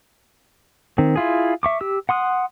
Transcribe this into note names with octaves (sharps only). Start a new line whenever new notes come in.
D#3 C4
E4 F4 G#4
E5 C#6 D6
G4 E6
F#5 C6 D#6 F#6